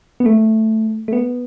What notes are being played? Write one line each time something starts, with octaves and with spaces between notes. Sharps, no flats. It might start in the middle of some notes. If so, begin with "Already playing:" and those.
B3
A3
A3
B3